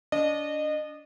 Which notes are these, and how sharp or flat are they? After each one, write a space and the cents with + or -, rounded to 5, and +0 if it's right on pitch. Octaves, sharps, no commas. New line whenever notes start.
D4 -30 D#5 -30